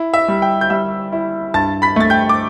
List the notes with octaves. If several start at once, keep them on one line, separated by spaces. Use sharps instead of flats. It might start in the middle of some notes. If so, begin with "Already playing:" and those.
Already playing: E4
E5
G3
G5
G6
G3 E5 E6
E4
G2 A5 A6
B5 B6
A3 A6
G5 G6
D6